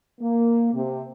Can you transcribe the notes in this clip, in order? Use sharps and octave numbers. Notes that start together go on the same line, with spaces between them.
A#3
C3